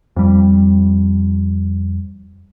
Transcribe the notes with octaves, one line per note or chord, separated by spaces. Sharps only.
F2 G3